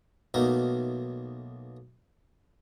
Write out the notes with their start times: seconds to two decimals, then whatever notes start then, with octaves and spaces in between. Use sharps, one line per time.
0.34 B1 B2 A3 A#3 D#4 A#4